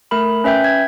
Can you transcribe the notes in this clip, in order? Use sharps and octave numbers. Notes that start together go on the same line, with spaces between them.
A3 A#4 B5
C#4 B4 E5 G5 G6
G#6